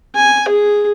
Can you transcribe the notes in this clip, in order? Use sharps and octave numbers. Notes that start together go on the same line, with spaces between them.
G#5
G#4